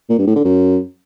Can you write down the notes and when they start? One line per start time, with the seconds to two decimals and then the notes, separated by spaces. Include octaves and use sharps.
0.10 A#2
0.18 G2
0.27 A2
0.36 D3
0.45 F#2